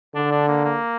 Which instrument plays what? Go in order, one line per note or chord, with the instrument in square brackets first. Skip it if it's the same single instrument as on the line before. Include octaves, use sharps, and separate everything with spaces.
[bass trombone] D3 [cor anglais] D4
[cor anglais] D4
A#3
A#3